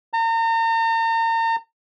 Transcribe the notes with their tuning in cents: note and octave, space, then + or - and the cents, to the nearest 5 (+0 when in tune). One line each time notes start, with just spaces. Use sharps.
A#5 -40